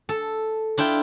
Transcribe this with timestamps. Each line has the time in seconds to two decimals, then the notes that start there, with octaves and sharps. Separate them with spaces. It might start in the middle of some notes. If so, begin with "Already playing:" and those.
0.09 A4
0.78 D4 E4 F4 G5